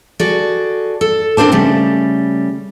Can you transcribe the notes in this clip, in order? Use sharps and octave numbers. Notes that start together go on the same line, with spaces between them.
F#4 G#4 A4 D5
A4
C4 D4 A#4 C5 A5
C#3 G3 A3